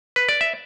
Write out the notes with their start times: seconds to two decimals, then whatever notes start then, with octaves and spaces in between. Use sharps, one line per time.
0.16 B4
0.29 D5
0.41 E5